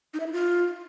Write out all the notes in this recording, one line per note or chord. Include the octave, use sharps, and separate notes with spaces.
D#4
E5
E4
F4